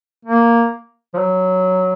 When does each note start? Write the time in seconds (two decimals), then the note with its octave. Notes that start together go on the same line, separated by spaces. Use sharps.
0.25 A#3
1.14 F3
1.18 F#3